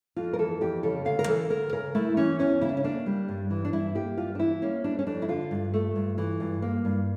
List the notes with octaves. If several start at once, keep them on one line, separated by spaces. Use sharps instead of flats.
F2 F4
A#4
E3 A4
F2 G4
C#3 A4
D2 F5
A#4
E3 A4
D2 A#4
C#3 A#4
A3 E4
E3 C#4
E2 C#4
C#3 E4
D4
C#4
A#3 D4
G3
G2
E3
D4
G2 E4
A#3 G4
G2 F4
D4
E3 E4
A#3 C#4
G3 D4
C#4
F2 D4
E4
D3 F4
G2
A3
G2
E3
G2
A#3
G2